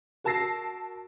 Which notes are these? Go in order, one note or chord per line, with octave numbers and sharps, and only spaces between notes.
F#4 A#4 A5 E6 A#6 C7